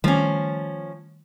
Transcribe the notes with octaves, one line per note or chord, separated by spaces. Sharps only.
D#3 F3 G3 A3 C#4